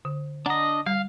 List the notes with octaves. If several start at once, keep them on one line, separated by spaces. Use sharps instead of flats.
D3
D4 D#5 F#5 A#5
G3 F5